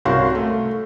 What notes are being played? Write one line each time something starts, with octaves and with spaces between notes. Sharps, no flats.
C2 C#4 F#4 A#4 F5 C6
A3